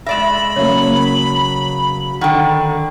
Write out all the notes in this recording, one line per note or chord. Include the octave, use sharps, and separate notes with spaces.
G#3 D5 E5 B5 A#6 E7
C#3 F#3 A#3 C#5
D3 D#3 F#5 G5